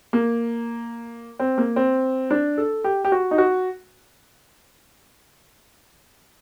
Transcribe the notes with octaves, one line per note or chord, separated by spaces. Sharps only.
A#3
C4
A#3
C4
D4
A4
G4
G4
F#4
D#4
F#4